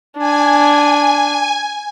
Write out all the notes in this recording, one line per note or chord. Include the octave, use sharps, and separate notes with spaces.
D4 G#5